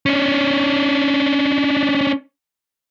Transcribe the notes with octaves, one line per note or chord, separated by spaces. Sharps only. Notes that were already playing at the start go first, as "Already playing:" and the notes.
C#4 D4